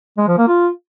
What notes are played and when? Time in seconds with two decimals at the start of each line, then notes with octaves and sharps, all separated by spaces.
0.17 G#3
0.27 F3
0.37 A#3
0.47 F4